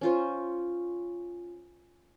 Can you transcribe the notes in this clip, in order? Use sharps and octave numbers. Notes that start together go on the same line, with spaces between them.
C#4 F4 C5